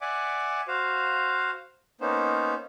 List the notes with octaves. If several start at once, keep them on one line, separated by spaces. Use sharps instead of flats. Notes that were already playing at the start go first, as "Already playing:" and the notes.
D5 E5 F#5 G#5 D6
F#4 C5 F5
A#3 B3 C#4 D#4 C5